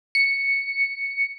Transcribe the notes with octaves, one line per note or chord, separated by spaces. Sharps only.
C#7